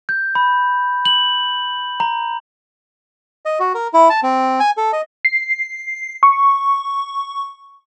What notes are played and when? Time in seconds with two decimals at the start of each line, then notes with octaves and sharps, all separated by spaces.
0.09 G6
0.35 B5
1.05 F#7
2.00 A#5
3.46 D#5
3.60 F#4
3.75 A#4
3.94 E4
4.10 A5
4.23 C4
4.60 G#5
4.77 A4
4.93 D#5
5.25 C7
6.23 C#6